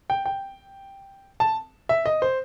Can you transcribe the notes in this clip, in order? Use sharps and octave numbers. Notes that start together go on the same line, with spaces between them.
G5
G5
A5
E5
D#5
C5